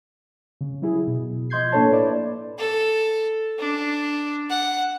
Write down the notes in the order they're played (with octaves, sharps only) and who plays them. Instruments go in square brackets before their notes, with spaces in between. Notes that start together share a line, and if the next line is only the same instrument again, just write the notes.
[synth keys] C#3
F#3 E4 G#4
B2
F3 D#5 C6 G6 G#6 C7
A2 A#3 D4 A4 C#5 A5
E4 B4 D5 A5
[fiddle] A4
D4
F#5